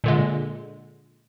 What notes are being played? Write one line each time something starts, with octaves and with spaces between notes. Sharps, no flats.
A#2 D3 G#3